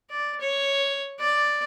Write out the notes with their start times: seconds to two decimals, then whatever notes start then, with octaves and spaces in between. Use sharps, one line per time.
0.10 D5
0.41 C#5
1.20 D5